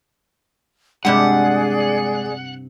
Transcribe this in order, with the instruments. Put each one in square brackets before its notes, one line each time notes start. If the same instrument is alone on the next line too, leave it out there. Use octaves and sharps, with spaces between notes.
[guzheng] G2 C3 G4 [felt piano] G#3 [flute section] G#4 D5 [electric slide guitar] F#5